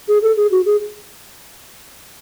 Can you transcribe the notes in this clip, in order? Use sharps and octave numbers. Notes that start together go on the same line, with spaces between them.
G#4
A4
G#4
F#4
G#4